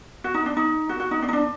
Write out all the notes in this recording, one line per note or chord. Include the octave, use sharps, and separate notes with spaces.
F#4
D#4
D4
D#4
F#4
F#4
D#4
D4
D#4
D4